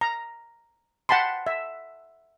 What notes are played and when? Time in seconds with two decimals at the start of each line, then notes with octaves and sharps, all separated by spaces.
0.01 A#5
1.09 F#5 G5 A5 B5 C6
1.47 E5